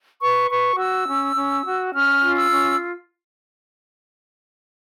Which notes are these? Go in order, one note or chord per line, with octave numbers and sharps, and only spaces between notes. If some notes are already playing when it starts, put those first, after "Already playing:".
B4 C#6
B4 C#6
F#4 E6
C#4
C#4
F#4
C#4 F6
F4
E6
C#4